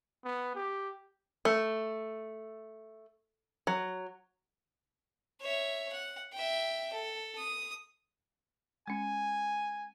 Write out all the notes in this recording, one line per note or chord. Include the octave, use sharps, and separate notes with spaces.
B3
G4
A3
F#3
C#5 E5
F#5
E5 G5
A4
D#6
G#3 C#4 G#5